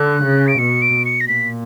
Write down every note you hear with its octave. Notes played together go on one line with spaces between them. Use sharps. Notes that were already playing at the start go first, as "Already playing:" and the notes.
Already playing: D3 F#6
C#3
D7
B2 C#7
D7
C#7
A#6
A#2 B6